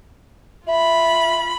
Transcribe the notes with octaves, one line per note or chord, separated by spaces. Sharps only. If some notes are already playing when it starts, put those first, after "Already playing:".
F4 E5 B5